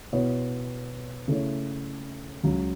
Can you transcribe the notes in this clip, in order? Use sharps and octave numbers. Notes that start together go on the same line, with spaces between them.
B2 B3 E4 C#5
C#3 A3 E4 C#5
C#2 C#3 F#3